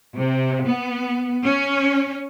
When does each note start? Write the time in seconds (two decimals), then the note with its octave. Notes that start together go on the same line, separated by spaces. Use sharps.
0.15 C3
0.65 B3
1.44 C#4